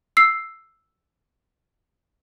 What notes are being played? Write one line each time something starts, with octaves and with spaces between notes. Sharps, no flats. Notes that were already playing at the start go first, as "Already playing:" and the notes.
E6 C7